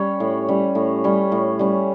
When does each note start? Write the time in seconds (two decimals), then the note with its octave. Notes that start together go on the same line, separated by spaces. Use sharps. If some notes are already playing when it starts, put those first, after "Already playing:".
Already playing: G3 C#4 C#5
0.20 A2
0.49 G3 C#4
0.75 A2
1.04 G3 C#4
1.32 A2
1.59 G3 C#4